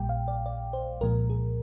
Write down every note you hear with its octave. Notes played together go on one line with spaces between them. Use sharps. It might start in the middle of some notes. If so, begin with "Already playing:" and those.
Already playing: A#1 A#2 G3 G5
F5
D5
D5
C5
C2 A#2 F3 G#3 A#4
G#4